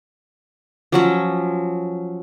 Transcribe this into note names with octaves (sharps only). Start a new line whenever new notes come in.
F3 F#3 C#4